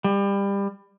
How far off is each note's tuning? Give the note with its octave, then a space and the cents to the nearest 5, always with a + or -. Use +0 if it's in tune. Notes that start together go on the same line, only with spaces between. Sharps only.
G3 +25